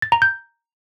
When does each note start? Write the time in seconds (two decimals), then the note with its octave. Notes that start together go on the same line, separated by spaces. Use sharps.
0.02 A6
0.12 A#5
0.22 G6